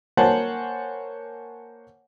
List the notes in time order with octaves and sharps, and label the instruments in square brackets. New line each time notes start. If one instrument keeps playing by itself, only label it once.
[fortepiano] A#3 C5 C#5 F#5 G#5 A5